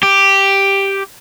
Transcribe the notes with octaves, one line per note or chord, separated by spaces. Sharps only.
G4